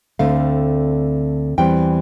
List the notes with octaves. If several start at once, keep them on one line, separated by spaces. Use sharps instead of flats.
D2 D3 A3 C4 F5
E2 E3 G3 C4 G5